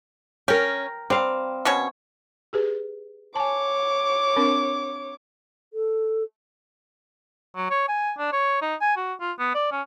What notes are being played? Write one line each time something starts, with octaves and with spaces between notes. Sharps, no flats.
C#4 A#4 G5
G3 C4 F5
B2 C#4 C#5
G4 G#4 B4
C#5 G#5 A5 D6
C4 D4 A#4
A4
F#3
C#5
G#5
D4
C#5
D#4
G#5
F#4
F4
B3
D5
C#4